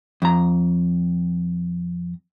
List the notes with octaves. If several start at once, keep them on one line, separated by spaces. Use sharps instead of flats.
F2 A#5